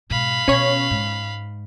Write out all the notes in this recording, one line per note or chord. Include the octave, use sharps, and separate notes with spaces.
G#2 B2 F5 B5
B2 C#4 C#5
G#2